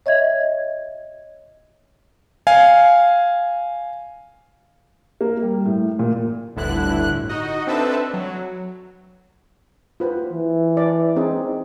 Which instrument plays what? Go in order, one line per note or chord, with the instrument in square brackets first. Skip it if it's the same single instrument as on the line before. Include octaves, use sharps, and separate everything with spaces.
[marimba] C#5 D#5 E5 G#6
[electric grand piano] F5 G#5
[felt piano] A#3
G3
A2
A#2
[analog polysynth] G1 D2 A2 D3 E4 F#6
D#4 F#4 D#5
C4 D4 A4 B4 E5 A5
F#3
[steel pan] F4 B4 C5
[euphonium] E3
[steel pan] D5
C4 D#4 G#4